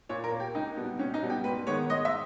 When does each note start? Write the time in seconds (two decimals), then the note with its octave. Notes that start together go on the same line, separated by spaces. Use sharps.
0.09 A#2 C#5
0.24 A#4
0.31 A#3
0.40 G4
0.55 C#2 D#4
0.76 B2 G3 B3
0.99 C#2 C#4
1.14 D#4
1.22 B2 G3 B3
1.30 G4
1.44 G#2 B4
1.67 D#3 G#3 B3 C#5
1.89 G#2 D#5
2.05 E5